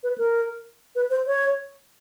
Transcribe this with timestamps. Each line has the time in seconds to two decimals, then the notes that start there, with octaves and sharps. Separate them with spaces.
0.03 B4
0.18 A#4
0.95 B4
1.10 C5
1.27 C#5